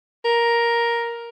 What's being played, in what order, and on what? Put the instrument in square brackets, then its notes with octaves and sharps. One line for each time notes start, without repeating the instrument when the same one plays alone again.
[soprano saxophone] A#4